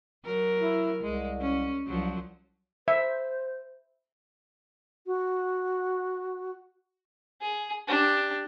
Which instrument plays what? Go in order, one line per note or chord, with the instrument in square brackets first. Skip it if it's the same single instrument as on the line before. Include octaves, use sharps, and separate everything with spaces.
[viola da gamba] F#3 A#4
[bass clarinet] E4
[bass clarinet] C2 [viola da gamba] G#3
[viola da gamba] C#4
[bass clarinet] C2 [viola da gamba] F3 F#3
[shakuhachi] C5 [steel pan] E5
[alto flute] F#4
[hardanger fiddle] G#4
D4 G4